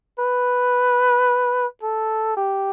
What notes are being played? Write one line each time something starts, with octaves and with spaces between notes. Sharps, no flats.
B4
A4
G4